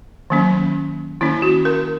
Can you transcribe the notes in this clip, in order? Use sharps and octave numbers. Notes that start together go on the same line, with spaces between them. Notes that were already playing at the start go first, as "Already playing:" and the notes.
D#3 F#3 A#3 C#4
D#3 A#3 C#4 E4
F#4
A#4